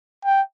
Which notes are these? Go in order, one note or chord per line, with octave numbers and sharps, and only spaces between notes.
G5